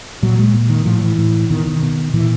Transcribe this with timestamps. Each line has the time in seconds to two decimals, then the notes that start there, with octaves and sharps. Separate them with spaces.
0.23 A#2 F#3
0.39 G#3
0.54 A#2
0.69 D#3
0.85 A2 F3
1.02 E3
1.18 A2
1.50 B2 D#3
1.66 D#3
1.82 B2
2.14 A#2 E3